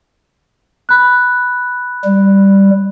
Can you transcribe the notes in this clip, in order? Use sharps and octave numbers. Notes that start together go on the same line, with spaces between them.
B5 F#6
G3